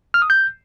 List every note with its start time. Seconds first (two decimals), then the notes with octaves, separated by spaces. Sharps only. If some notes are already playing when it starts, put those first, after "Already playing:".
0.14 F6
0.22 D#6
0.30 G6